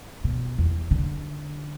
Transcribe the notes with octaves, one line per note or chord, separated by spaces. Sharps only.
B2
E2
D3